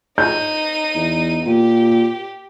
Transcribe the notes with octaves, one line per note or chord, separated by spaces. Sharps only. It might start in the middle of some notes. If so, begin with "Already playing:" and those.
D#4 G6 D#7
E2
A#2 G4